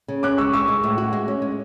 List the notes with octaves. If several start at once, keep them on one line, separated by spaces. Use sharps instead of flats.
C#3
C#4 D6 F#6
G#3 C#6 E6
G#3 C#6 E6
G#3
A2
F#4
G#3
C#4
G#3